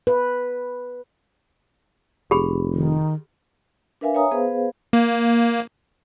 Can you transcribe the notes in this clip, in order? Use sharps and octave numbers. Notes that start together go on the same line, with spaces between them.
B4
F1 G4 G#4 B5
D#3
D4 A#4 B4 E5 F5 G#5
C#5 E5 G#5 A#5 D#6
B3 G#4 B4 C5 F5
A#3